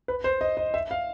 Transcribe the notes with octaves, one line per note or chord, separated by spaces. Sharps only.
B4
C5
D#5
D#5
E5
F5